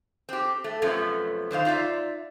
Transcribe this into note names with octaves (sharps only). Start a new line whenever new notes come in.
C4 G4
A3
F#2 C3 F3 A3 B3 C#4
D3 D#3 C5 F5
D#4 F4 D5 E5